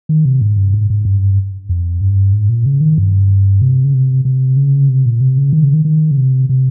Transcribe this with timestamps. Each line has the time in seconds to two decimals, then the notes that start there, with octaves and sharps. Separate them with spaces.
0.09 D#3
0.25 C3
0.41 G#2
0.57 G2
0.74 G#2
0.90 G#2
1.05 G2
1.69 F2
2.01 G2
2.33 G#2
2.49 A#2
2.66 C#3
2.81 D#3
2.98 G2
3.61 C3
3.84 C#3
3.94 C3
4.25 C3
4.57 C#3
4.89 C3
5.06 A#2
5.21 C3
5.37 C#3
5.53 D#3
5.64 C#3
5.74 D#3
5.85 D#3
6.11 C#3
6.18 C3
6.49 C3